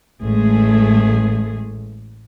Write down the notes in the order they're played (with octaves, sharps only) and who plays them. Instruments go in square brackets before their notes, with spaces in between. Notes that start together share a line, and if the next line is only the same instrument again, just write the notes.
[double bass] A1 [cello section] G#3 A3 G#4